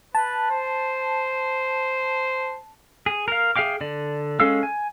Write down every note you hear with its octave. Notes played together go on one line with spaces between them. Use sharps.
B4 A5
C5
G#4
A#4 F5
G#4 E5 F5 G5 D6
D3 D5
G#3 C#4 A4 F5 E6
G#5